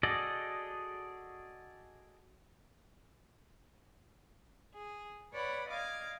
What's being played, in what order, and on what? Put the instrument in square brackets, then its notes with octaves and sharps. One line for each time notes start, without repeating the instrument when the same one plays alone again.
[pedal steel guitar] F#4 G#4 A4 D5 D#5
[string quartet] G#4
B4 C#5 D5 F#5 B5
D5 D#5 F5 D6 G#6